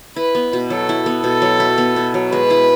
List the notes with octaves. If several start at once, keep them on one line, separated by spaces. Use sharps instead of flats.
E4 B4
B3
B2
F#3 A4
E4
B3
B2 A4
F#3
E4
B3
B2
F#3
G#3 B4
E4